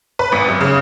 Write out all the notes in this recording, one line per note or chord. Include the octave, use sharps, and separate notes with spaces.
B4
G#1
F#2
C#3